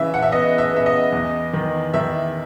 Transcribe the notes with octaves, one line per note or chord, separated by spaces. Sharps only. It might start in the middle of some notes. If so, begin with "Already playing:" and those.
Already playing: C#3 E3 E5
F#5
E5
B3 D#5
E5
B3 E5
D#5
E2
D#3
D#3 E5